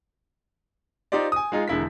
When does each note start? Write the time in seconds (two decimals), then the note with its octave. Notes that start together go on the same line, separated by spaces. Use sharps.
1.12 D#4 F4 G4 C5 D5
1.32 G#5 D#6
1.52 G#3 D#4 F4 G#4
1.68 E1 D3 G#3 E4 A#4 B6